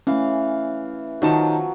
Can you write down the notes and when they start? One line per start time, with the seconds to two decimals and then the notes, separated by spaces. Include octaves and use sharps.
0.07 E3 A3 C#4 F5
1.22 D#3 F3 F#3 D#4 A5